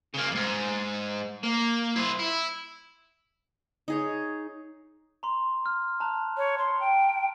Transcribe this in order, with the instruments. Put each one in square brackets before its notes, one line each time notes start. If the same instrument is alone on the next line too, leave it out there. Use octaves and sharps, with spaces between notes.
[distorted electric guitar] C#3 A#3
F2 G#2
A#3
E4 C5
E4
[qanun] D#4 G#4 C#5
[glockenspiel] A#5 C6
F6
A5 A#5 F#6
[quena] C#5
C6
G5